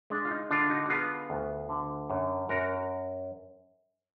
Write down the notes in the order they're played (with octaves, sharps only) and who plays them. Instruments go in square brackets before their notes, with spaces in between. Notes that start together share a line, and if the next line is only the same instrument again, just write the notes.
[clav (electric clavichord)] G#3 D4
F4
D#4
D3 D4 F4
D#4 F#4
F#4
B3 F4 G#4
D2
D3
F#2
F#2 F#4 A#4